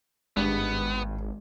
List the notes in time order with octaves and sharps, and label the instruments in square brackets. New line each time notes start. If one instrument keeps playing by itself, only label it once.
[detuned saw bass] G#1 [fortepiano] G2 [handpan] G#3 [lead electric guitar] B3